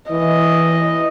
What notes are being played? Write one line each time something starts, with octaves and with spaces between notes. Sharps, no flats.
E3 D#5